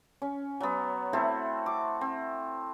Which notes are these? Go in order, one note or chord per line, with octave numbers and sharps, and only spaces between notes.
C#4
F#3 B3
A3 C4 E4 F#4
D6
C4